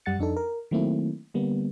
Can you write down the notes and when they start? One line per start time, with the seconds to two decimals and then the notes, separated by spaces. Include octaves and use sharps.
0.06 F#2 G3 F#5 A6 C#7
0.19 F2 D4 D#4 A4
0.37 A#4
0.71 D#3 F#3 A3 A#3 C4 E4
1.34 D3 G3 A#3 B3